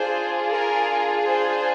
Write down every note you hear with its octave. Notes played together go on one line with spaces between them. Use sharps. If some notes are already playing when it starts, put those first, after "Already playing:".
Already playing: D4 F4 G#4 C5
A#4
C5